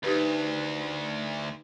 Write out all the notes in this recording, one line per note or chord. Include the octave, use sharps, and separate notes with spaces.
D2 D#4 G4 B4